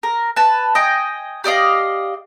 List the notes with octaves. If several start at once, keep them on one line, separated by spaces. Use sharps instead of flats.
A#4
B4 A5
D#5 G5 G#5
G4 D5 D#5 F5